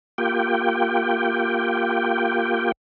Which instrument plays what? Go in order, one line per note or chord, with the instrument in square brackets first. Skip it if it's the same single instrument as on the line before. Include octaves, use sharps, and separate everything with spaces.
[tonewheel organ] A#3 F4 G4 G5